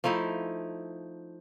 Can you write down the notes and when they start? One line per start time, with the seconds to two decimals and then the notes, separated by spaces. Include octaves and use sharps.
0.04 F3 A3 D#4 E4